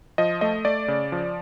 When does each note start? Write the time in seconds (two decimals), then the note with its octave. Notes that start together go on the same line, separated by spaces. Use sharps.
0.18 F3 D#5
0.41 A3 D#5
0.65 A3 D5
0.88 C#3
1.12 F3